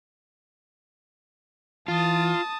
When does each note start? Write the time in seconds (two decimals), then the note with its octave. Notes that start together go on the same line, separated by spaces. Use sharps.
1.88 E3 F4 A5 D#6